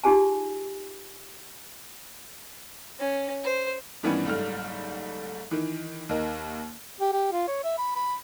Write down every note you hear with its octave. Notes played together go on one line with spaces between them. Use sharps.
D#4 F4 G4 G#4 G#5 A5
C#4
C5
G2 D#3 E3 G3 B3 C#4
F#1 G#2 G3 A3 F6
D#3 E3
D#2 D#4 A#4
G4
G4
F4
C#5
E5
B5
B5